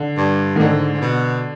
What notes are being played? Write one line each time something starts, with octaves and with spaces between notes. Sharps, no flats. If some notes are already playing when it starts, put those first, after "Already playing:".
Already playing: D3
G2
D#3
G#2 D3
G#2
B2